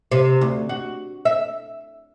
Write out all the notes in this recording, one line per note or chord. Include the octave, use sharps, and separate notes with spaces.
C3
D2
F#4
E5